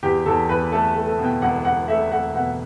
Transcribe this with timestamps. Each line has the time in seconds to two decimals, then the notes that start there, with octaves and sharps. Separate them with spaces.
0.03 E2 G4
0.26 E2 A4
0.49 E2 B4
0.72 A3 A4
0.95 A3
1.07 A4
1.19 B2
1.24 G5
1.42 E1 F#5
1.65 B2 F#5
1.88 A3 E5
2.11 A3 F#5
2.34 B2 F#5